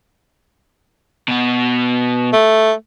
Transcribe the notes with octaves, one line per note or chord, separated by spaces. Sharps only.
B2 B3
A3